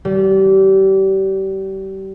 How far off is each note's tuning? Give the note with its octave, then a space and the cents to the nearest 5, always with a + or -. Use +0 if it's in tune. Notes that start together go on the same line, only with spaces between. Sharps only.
G3 -30